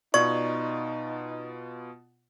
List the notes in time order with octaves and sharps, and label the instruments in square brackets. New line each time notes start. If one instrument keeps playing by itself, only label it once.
[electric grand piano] B2 B3 F4 [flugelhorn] D#4 [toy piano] D5 [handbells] C#6